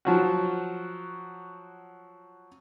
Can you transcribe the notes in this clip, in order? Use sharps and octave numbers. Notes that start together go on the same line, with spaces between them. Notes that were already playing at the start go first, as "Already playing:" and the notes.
F3 F#3 F#4